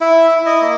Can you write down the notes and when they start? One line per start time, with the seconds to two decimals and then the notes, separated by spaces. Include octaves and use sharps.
0.01 E4 E5
0.32 E4
0.46 D#5
0.61 A#3